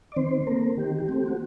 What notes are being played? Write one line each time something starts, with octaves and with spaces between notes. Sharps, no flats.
D5
D#3 C4 C5
C5
A3 A#3 C4 A#4
D#3 G4
G4
A3 C4
G4
F#4